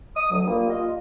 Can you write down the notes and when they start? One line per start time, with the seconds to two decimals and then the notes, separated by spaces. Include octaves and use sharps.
0.17 D#6
0.31 D2 F#3
0.47 G3 A#3 F4
0.70 F4 D#5